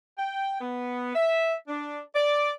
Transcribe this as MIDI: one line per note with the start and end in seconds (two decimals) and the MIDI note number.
0.19 0.58 79
0.61 1.15 59
1.15 1.55 76
1.68 2.00 62
2.15 2.52 74